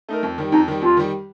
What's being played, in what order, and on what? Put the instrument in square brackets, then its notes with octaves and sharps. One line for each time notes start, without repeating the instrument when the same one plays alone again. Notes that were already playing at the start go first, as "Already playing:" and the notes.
[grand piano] A3 D#4 A#4
F2
D#3 G3
[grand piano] F2 [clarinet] D#4
[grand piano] D#3 G3
[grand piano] F2 [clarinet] F4
[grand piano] D#3 G3